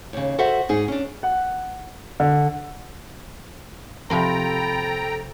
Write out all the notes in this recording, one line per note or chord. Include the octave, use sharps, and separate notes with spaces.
D#2 C#3
F#4 A4 C5 E5 F#5
G#2 D#4 G#4
C#4 D4
F#5
D3
C3 F3 C4 A4 G5 A#5 B5